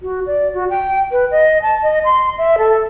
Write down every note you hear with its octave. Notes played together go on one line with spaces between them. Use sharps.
F#4
D5
F#4
G5
B4
D#5
A5
D#5
C6
E5
A4